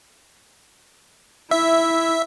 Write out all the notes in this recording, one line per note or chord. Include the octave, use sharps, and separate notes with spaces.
E4 E5